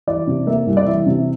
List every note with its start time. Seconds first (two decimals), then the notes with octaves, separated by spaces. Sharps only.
0.07 E3 D5
0.27 C3
0.47 A#3 E5
0.67 C2
0.77 D5
0.86 E3 E5
1.07 C3